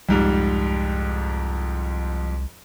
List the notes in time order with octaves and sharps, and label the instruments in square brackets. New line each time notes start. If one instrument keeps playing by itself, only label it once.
[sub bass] C2 [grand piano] F2 G#2 G3